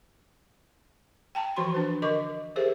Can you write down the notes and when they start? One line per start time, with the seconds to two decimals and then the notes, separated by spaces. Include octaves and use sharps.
1.35 G5 A5 A#5
1.56 E3 F3 F#4 B5 C6
1.72 D4 B4 C5
2.02 D3 A#4 D#5 C#6 D6
2.56 G4 G#4 A#4 C5 E5